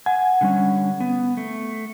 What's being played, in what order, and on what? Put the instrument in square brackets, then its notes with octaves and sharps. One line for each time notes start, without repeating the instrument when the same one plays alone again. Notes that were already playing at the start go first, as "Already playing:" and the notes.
[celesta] F#5 [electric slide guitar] G#5
[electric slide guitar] D3 G3 C#4
B3
A3